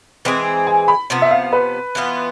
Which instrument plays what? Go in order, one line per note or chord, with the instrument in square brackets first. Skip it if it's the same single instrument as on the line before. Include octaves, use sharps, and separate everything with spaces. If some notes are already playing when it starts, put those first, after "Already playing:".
[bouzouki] E3 G#3 C4 G#4
[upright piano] G#5
B5
[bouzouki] C3 F3 B3
[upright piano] E5
F5
B4
[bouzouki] E3 B3 F4